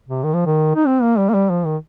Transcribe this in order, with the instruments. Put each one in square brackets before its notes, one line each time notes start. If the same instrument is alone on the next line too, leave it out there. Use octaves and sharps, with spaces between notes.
[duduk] C3
D#3
F3
D#3
D#4
C4
A#3
G3
A#3
G3
F3
D#3